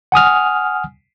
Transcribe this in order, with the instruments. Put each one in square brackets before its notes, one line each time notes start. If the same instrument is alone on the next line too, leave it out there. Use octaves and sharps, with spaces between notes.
[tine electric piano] F#5 G#5 D#6 F6